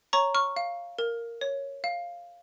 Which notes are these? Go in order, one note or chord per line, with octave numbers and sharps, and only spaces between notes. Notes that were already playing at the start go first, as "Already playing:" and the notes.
C#5 A#5 C#6
C#6 F6
F5
A#4
C#5
F5